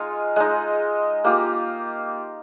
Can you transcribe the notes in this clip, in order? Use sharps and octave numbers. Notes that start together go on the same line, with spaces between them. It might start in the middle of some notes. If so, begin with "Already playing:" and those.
Already playing: G#3 D#4 F4
G#3 D#4
A#3 F4 G4